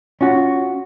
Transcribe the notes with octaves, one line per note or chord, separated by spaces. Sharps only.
C#4 F4 F#4